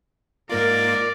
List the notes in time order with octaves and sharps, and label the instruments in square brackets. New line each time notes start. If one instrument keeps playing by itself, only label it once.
[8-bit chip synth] G#2 A#3 F4 [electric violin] A#4 [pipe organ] D5